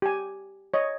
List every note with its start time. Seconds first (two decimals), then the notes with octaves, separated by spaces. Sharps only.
0.02 G4 G#5
0.74 C#5 D#5